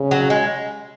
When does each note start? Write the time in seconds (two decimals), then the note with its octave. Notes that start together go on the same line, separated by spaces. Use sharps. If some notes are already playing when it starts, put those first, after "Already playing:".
Already playing: C#3
0.11 F#3
0.30 G#3